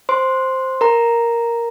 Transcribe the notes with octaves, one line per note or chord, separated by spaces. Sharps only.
C5 C6
A#4 A#5